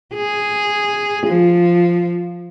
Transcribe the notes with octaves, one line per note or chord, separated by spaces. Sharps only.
G#4
F3